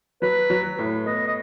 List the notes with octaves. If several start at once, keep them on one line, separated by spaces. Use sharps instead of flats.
F#3 B4
F#3
A2
B3 D#5
D#5